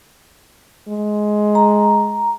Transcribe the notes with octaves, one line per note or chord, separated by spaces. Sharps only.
G#3
A#5